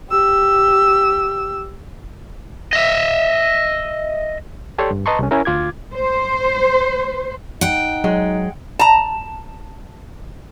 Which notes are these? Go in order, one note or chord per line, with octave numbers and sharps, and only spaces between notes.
G4 E6
D#5 E5
G4 A4 C#5 D5 C6
G2
B4 D#5 A5 A#5 C6 C#6
C2 C#4
C#4 E4 A#4
D2 F4 D6 G#6
C5
D#4 F#5 G5
F#3 G#3
A5 A#5